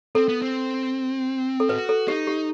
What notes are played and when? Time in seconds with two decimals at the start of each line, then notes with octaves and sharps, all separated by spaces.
0.15 C4 A4
0.28 B3
0.42 C4
1.60 A4
1.69 F#4 B4
1.89 A4
2.08 D#4 G4
2.27 G4